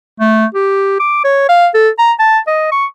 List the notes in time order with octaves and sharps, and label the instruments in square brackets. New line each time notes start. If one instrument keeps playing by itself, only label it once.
[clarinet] A3
G4
D6
C#5
F5
A4
A#5
A5
D#5
C#6